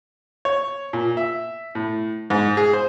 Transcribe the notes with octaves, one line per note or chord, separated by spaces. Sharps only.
C#5
A#2
E5
A2
G#2
G#4
C5